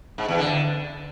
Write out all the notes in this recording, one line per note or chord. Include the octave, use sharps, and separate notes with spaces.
G#2
E2
D3